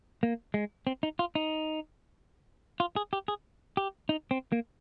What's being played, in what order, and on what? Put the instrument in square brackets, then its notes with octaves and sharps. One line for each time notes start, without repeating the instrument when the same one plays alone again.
[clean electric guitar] A#3
G#3
C4
D#4
F4
D#4
F4
G#4
G4
G#4
G4
D#4
C4
A#3